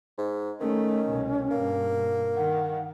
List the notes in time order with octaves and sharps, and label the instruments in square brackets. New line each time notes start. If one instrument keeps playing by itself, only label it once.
[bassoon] G#2
[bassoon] D#3 [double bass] A3 [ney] C#4
[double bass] C2 B2
[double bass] G2 B2 [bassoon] A#3
[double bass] D#3 [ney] F#5